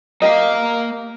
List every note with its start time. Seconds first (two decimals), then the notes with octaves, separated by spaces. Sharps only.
0.22 A#3 G4 A#4 D#5 F5